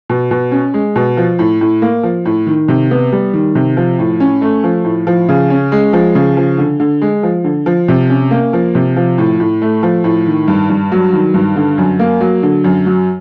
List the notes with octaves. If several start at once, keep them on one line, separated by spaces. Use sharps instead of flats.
B2
B2
C#4
G#3
B2
F3
A2
A2
A#3
F3
A2
D#3
C3
B3
G3
D#3
C3
F3
A2
C#4
A3
F3
A2
F3
C#3
C#4
G#3
F3
C#3
F3
D3
D3
G#3
F3
D3
F3
C3
C#4
A#3
F3
C3
F3
A2
A2
A3
F3
A2
D#3
G2
G2
F#3
D#3
G2
D3
F#2
A#3
F#3
D3
F#2
F#3